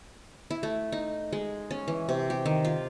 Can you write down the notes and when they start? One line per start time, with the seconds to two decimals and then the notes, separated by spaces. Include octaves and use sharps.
0.50 E4
0.63 A3
0.92 D#4
1.33 G#3
1.71 C#4
1.88 E3
2.09 C3
2.30 G4
2.46 D#3
2.65 F4